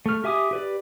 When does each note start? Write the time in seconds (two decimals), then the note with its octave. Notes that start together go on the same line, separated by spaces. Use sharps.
0.06 A3 F6
0.24 G4 E5 G#5 D6 D#6
0.51 G4 B4 D5